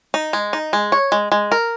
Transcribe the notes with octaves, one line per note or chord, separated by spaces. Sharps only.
D#4
G#3
D#4
G#3
C#5
G#3
G#3
A#4